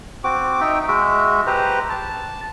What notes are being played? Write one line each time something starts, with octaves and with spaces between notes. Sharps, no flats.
C4 F#4 D6
D#4 E5 G5
G#3 F#4 E5
G4 B4 C5 A#5
A5